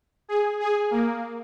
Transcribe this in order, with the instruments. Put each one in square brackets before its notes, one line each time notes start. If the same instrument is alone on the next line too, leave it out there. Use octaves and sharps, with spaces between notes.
[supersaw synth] G#4
G#4
A#3